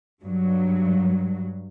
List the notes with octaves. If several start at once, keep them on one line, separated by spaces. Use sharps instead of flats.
G2 F#3